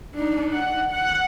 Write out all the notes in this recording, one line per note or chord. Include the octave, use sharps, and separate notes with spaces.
D4 D#4
F#5
F#5